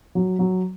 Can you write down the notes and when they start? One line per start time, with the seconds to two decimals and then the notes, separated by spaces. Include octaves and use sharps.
0.15 F#3
0.39 F#3